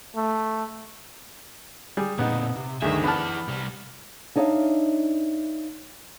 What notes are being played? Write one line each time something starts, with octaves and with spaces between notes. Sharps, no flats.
A3
G3 G#4
A#2 B3 C4 D#4
C3
D2 G2 D#3 G#4 E5
E3 B3 D5 A5 B5 F6
C2 G3
D4 D#4 C#5 D5 E5 F5